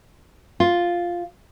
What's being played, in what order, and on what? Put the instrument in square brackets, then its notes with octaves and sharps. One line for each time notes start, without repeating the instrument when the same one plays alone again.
[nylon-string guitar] F4